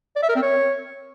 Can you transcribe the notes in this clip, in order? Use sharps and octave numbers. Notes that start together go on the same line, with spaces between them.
D5
E5
A#4
C4
C#5